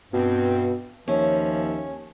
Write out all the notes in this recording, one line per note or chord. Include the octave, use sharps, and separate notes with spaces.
G2 B2 C4
D#2 F3 C#4 E5